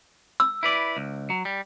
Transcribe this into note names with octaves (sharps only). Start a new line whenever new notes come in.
E6
E4 B4 D5
C#2
F#3
G3